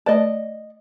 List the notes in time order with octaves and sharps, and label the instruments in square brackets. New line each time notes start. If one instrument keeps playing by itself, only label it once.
[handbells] A3 B4 A5 [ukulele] D5 D#5